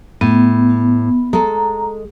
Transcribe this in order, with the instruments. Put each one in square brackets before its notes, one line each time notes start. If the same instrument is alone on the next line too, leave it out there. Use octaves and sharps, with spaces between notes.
[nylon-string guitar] A2 [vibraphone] B3
[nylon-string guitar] G#3 A4 [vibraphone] A#5